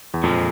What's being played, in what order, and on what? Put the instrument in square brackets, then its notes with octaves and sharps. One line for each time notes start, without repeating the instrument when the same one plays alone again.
[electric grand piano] E2
[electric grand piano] F2 [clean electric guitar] A#2 F3 G#3